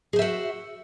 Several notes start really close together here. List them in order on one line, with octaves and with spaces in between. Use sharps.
G#4 C5 E5 F#4